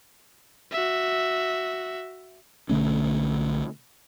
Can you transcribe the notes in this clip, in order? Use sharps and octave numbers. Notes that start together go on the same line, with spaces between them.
F#4 E5
B1 D3 A3 C#4